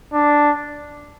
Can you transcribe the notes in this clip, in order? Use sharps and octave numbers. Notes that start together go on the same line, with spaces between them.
D4